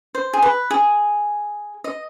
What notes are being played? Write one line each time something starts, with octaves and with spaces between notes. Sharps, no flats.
C5
G#4
B4
G#4
D#5